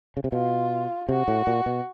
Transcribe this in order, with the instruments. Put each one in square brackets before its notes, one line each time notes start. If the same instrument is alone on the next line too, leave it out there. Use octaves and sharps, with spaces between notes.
[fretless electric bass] C#3
C3
[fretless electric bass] B2 [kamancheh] F4
[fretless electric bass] C3 [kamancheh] F#4
[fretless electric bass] A2
A#2
B2